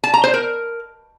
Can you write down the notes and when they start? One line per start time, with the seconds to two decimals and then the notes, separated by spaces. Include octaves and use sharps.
0.04 A5
0.14 A#5
0.24 C5
0.34 A#4